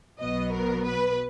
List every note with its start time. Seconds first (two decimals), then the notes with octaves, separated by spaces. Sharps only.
0.20 B1 B2 F#3 B3 D#5
0.53 A#4
0.85 B4